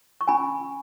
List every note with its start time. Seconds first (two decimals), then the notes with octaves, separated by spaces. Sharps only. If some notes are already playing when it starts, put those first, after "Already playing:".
0.21 C#6
0.28 C#4 G#5 B5